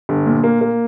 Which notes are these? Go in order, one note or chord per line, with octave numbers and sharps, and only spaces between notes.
G1
A#2
A#3
A#3